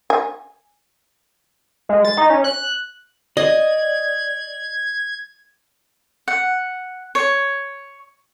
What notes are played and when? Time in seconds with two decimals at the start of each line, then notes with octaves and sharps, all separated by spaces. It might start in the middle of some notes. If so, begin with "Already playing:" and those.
0.10 G#5
1.89 G#3
2.05 A6
2.17 D#4
2.30 C#4
2.44 F#6
3.37 D5 D#5 G#6
6.28 F#5
7.15 C#5